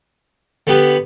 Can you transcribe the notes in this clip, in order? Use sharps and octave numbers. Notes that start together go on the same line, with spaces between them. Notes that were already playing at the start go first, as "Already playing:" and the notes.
D3 B3 G4 B4